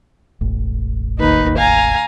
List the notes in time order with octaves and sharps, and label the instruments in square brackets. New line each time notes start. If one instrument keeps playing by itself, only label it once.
[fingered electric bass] E1 A1
[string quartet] D#2 D#4 B4
F5 G#5 A#5